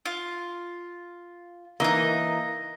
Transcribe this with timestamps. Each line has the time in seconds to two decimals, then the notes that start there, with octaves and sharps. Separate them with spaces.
0.05 F4
1.80 E3 A#3 D#4 D#5